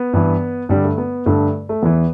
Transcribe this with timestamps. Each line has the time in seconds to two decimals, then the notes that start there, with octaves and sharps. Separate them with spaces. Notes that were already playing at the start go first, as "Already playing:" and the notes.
Already playing: B3
0.13 G2 E3
0.69 G2 D3 G3
0.84 A3
0.98 B3
1.26 G2 D3 A3
1.69 A3
1.82 E2 E3 B3